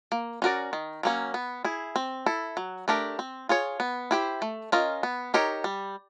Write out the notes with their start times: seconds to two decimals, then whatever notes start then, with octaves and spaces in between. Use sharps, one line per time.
0.12 A#3
0.42 C#4 F#4 A#4 D5
0.73 D#3
1.03 F#3 A#3 C#4
1.34 B3
1.65 E4 G#4
1.96 C4
2.26 E4 A4
2.57 F#3
2.88 A3 D4 G4 A#4
3.19 C4
3.49 F4 G#4 C#5
3.80 B3
4.11 E4 G4 C5
4.42 A3
4.72 C#4 F4 A#4 D#5
5.03 B3
5.34 D#4 G4 A#4 C#5
5.64 G3